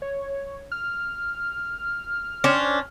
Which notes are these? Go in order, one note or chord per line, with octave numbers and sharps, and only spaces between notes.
C#5
F6
C#4 D4 C5